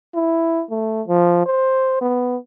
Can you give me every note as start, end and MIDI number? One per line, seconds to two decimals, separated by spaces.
0.15 0.63 64
0.71 1.02 57
1.07 1.44 53
1.46 2.00 72
2.01 2.37 59